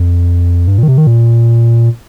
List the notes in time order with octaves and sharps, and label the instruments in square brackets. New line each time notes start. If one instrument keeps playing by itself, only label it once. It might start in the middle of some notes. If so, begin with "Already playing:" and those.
Already playing: [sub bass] F2
G2
A#2
D#3
C3
D#3
A#2